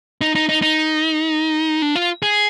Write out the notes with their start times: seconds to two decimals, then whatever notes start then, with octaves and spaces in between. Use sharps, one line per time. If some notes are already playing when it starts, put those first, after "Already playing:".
0.21 D#4
0.35 D#4
0.49 D#4
0.62 D#4
1.82 D4
1.96 F4
2.22 G#4